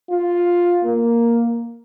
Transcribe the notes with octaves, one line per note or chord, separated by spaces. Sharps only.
F4
A#3